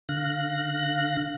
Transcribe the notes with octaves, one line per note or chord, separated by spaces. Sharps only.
D3 F5 F#6 A#6